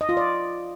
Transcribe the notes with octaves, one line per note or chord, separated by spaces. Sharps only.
D#5
F4
D5